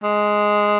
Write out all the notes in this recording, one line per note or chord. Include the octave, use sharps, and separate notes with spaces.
G#3